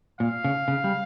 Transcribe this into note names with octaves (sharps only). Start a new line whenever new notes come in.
A#2 F5
C#3
C#3
G3